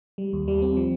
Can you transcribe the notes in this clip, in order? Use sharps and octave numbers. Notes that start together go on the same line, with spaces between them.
G3
D#2
G3
C4
F3